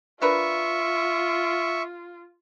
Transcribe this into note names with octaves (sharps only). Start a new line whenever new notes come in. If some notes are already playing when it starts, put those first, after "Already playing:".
D4 F4 A#4 B4 E5 C#6